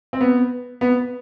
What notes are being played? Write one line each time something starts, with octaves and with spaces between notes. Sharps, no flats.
C4
B3
B3